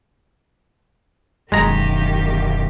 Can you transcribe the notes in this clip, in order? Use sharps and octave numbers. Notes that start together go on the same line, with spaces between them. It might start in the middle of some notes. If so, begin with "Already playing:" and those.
E1 F#2 B2 D3 D#3 G#3 G4 A#5